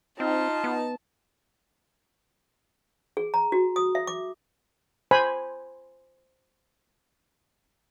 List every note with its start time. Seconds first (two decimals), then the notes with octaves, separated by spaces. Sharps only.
0.20 C4 D#4 F4 A5
0.64 B3
3.17 G#4
3.34 A#5
3.52 F#4
3.76 D#6
3.95 E5
4.07 D6
5.11 C5 G#5 B5